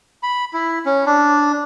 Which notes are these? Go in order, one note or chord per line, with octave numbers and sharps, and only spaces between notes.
B5
E4
C#4
D4